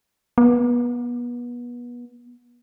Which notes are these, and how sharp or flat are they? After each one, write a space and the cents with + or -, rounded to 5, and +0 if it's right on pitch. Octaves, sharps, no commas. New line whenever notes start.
B3 -30